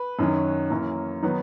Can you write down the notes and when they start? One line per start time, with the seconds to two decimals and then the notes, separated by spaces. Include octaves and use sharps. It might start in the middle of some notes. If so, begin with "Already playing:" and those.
Already playing: B4
0.19 F#2 D#3 F#3 C#4
0.70 F#2 E3 A#3 C#4
1.22 D#3 F#3 B3 D#4